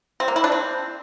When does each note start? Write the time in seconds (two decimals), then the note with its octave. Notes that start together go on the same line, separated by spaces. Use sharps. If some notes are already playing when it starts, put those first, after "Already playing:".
0.20 C4
0.28 A#3
0.36 E4
0.44 D4
0.52 C4